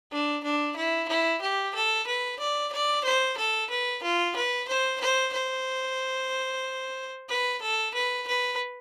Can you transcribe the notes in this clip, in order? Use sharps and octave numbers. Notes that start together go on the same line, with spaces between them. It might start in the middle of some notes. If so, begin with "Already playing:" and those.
D4
D4
E4
E4
G4
A4
B4
D5
D5
C5
A4
B4
F4
B4
C5
C5
C5
B4
A4
B4
B4